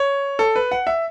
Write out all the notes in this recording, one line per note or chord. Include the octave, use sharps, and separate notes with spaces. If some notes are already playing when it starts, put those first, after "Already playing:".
Already playing: C#5
A4
B4
F#5
E5